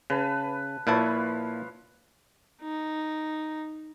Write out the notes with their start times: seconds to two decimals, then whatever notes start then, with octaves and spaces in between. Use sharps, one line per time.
0.10 C#3 B4 A5
0.87 A#2 F3 E4 B4 C#5 A5
2.62 D#4